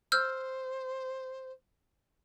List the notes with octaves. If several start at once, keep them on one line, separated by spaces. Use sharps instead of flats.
C5 E6 F6 G6